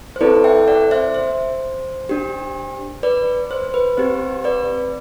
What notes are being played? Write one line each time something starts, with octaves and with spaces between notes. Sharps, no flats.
C5
C4 E4 A4 B4 D5
E5 G5
D5 F#5
C5 E5
C5
D4 G4
B4 D5
C5
B4
C4 G4 C5
B4 D5